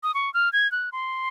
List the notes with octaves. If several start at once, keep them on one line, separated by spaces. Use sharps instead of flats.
D#6
C#6
F6
G#6
F#6
C6